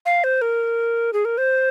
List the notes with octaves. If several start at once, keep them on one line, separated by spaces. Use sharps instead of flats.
F5
C5
A#4
G#4
A#4
C5